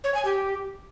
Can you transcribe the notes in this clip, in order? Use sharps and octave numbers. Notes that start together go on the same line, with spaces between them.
C#5
G#5
G4